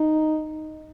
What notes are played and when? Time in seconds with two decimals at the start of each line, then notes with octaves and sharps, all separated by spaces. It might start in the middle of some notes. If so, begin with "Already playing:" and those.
Already playing: D#4